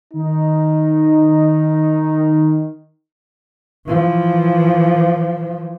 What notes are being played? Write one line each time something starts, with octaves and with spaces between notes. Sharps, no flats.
D#3 D#4
E3 F3